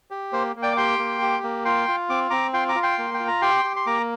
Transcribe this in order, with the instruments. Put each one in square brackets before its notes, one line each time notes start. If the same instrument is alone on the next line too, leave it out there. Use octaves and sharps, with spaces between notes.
[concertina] G4
A#3 C5
A#3
D5 G5
D6
G4 G5 C6
A#3
G4
A#3
F4 G5 C6
F4
C4 D6
C4 A#5 D6
F4 G5 C6
A#5 D6
F4
G5 C6
A#3
G5
F4
A#5
G4 G5 C6
G4
C6
A#3 A#5 D6